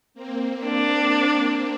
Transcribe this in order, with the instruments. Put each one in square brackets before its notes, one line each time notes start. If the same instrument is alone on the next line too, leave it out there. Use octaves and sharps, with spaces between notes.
[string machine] A#3 C4
[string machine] A#3 C4 [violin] D4